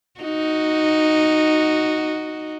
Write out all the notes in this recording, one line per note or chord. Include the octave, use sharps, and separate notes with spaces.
D#4 F#4